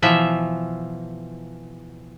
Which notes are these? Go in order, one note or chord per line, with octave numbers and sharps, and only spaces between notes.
B2 E3 F3 E5